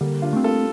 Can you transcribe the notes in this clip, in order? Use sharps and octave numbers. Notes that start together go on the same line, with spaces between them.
D3 G3 A#3
D4 F4
A3 C4
F4 A4